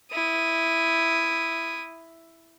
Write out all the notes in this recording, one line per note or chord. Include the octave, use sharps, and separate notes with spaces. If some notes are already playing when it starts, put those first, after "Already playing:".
E4 D#6